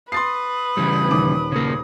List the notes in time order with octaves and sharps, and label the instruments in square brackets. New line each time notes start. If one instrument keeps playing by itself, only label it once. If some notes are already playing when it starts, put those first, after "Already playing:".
[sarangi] B4 [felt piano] C6 A6 C7 [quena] D#6
[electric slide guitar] C#3 E3 G3
[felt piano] D#1 D#3 D6
[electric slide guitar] C#3 A#3